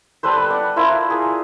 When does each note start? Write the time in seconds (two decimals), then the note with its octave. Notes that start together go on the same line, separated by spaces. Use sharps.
0.23 G3 A4 B4 C5
0.37 B4
0.50 D5 F#5
0.76 E4 F4 A#4 C5
1.10 G#4 A#4